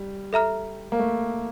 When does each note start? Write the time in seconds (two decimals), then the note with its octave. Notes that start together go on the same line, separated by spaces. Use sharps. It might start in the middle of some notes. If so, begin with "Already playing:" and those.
Already playing: G3
0.33 A4 E5 A#5 F6
0.92 A#3
0.99 A3